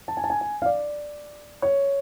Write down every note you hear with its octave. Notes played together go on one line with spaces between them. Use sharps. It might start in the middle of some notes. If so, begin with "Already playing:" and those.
A5
G#5
A5
G#5
G#5
F5
D5
C#5